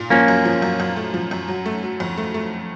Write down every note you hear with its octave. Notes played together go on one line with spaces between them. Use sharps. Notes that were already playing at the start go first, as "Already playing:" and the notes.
Already playing: A#2
F3 A#3 C#4
F#2
F3
F#2
F#2
A3
F3
F#2
F#3
A3
F#3
F2
A3
A3